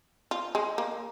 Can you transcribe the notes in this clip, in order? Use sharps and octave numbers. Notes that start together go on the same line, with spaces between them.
F4
G#3
A#3